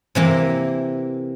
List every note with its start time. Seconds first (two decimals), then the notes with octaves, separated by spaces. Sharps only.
0.15 C3 E3 A#3